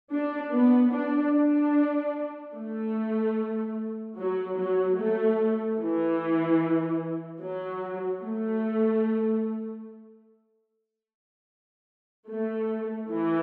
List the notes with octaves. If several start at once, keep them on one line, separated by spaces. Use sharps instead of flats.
D4
B3
D4
D4
A3
F#3
F#3
A3
E3
F#3
A3
A3
E3